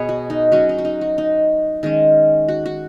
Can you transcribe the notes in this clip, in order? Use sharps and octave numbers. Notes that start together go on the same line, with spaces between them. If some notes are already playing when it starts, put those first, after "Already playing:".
Already playing: B2 G#4 B4 C#5 D#5
F#4
D#4
F#3 C#4 F#4
D#4
F#4
D#4
F#4
D#4
D#3 G#3 C#4
F#4
F#4